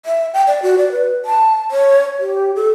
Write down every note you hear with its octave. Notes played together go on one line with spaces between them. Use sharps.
E5
G5
D5
F#4
D5
B4
A5
C#5
G4
A4